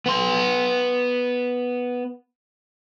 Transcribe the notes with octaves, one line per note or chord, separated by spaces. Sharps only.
B3 C6